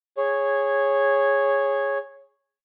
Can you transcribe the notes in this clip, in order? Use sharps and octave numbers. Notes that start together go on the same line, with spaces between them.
G#4 C#5